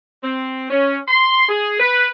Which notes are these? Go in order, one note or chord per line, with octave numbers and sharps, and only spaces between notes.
C4
C#4
C6
G#4
B4